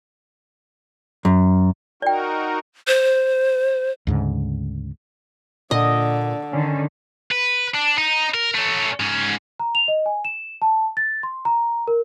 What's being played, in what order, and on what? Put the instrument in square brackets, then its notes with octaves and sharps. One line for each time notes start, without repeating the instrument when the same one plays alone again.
[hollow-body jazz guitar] F#2
[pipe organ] D#4 F#4 A#4 [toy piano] D5 G5
[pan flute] C5
[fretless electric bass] D2 G#2 C#3
[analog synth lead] A#2 [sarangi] D3 [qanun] D#5
[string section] D3 D#3 [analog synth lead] C#4
[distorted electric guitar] B4
D4
D#4
A#4
A3 C#4
G#2 C#4
[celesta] A#5
F7
D#5
G#5
E7
A5
A6
C6
A#5
A#4